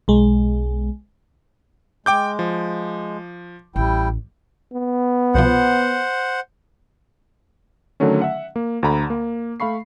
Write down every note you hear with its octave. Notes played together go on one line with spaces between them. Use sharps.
B1 G#3
G#3 G5 D6 G6
F3
A1 G3 E4 G5
B3
C2 B2 F3 C5 F#5
D3 D#3 F#3 A3 C#4
E5 F#5
A#3
D2 D3 A#5 B5
A#3
A3 F5 B5 C#6 C7